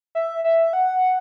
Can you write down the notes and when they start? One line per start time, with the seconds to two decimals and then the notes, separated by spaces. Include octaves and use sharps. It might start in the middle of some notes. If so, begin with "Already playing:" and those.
0.15 E5
0.44 E5
0.73 F#5